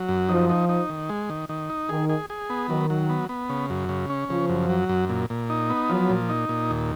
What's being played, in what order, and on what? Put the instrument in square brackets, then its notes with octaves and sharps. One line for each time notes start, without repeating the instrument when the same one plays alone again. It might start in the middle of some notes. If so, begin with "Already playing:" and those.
Already playing: [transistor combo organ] F#3
F#2
[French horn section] F3 [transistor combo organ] D#4
[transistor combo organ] D#4
D#4
D#3
G#3
D#3
D#3
D#4
[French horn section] D#3 [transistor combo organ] G#4
[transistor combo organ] G#4
G#4
B3
[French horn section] D#3 [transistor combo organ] F#3
[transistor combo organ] F#3
B3
B3
C#3
F#2
C#3
C#4
[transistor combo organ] C#3 [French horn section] F3
[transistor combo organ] F#2
F#3
F#2
A#2
A#2
D#4
B3
[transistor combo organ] F3 [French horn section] F#3
[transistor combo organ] A#2
D#4
A#2
D#2